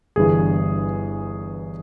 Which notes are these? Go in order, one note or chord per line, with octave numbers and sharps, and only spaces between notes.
G1 G2 E3 G#4